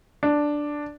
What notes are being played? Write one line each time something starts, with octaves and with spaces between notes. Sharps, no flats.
D4